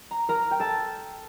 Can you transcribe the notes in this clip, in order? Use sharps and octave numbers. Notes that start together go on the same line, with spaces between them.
A#5
A#4 A#5
G5
A4 A5